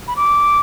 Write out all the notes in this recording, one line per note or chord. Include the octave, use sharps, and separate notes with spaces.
B5
D6